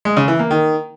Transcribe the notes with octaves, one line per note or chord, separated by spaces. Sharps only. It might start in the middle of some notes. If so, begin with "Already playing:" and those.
G#3
C#3
E3
A#3
D#3